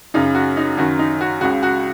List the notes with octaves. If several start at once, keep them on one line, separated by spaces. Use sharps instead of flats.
F#2 C#3 D#4
F#4
D#4
F#2 D#3 F#4
D#4
F#4
C#2 C#3 F#4
F#4